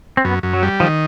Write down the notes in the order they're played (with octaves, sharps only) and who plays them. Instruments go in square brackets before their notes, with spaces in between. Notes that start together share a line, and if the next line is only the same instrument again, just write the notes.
[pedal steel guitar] C4
[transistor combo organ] F#2 [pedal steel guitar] B3
[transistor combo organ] F#2
[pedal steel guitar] F#3
[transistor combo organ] G3
[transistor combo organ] D#3 [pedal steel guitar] F3